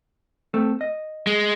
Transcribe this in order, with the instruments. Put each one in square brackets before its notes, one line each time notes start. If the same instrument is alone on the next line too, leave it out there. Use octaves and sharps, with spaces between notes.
[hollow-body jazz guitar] A3 C4 A4
D#5
[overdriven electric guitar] G#3